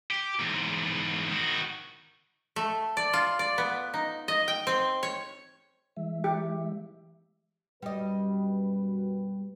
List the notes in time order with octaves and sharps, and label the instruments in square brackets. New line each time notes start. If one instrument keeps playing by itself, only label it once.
[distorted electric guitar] G4
E2 G#2
D#3 F#4
[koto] A3
D5
F4
D5
B3
D#4
D#5
G5
C4
C#5
[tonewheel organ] E3 G#3 E5
[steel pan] G4
[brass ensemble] F#2 B2 B4 [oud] G3 D#5